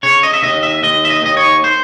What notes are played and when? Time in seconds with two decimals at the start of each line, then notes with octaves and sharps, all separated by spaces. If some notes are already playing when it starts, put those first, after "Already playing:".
0.03 C#3 C#5
0.23 D#5
0.33 E5
0.43 D#2 D#5
0.63 E5
0.83 D#2 D#5
1.05 E5
1.10 D#5
1.23 D#2 D#5
1.37 C#5
1.64 C5